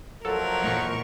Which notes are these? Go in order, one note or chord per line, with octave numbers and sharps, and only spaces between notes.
A#1 F3 F#3 A4 A#4
E2 A#2 C#6